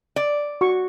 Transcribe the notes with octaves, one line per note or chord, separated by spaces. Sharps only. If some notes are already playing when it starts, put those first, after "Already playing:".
D5
F#4 C#6